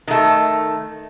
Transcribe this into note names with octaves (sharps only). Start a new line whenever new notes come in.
D#3 A3